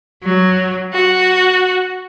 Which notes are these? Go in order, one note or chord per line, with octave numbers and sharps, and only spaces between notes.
F#3
F#4